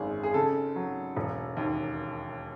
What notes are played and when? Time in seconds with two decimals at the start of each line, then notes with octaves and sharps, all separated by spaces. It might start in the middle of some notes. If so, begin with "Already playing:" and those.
Already playing: G#1 F#2 G#4
0.23 G#4
0.34 C#3 A4
0.76 F#3
1.17 E1
1.57 D#2